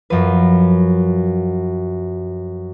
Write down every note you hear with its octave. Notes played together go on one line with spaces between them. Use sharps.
F#2 F3 B4